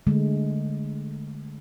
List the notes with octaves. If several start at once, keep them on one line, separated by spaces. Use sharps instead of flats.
D3 G#3 A3